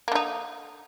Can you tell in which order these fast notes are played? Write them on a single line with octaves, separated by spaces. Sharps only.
A#3 D3 D#4